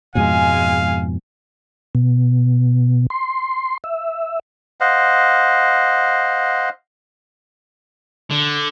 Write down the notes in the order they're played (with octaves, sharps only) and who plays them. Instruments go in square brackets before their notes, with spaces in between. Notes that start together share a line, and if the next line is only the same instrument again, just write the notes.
[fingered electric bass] F2 G#2 B2 [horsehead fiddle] G#3 G#5 [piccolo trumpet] F5
[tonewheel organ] B2
C6
E5
[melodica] C5 D#5 F5 F#5
[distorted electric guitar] D3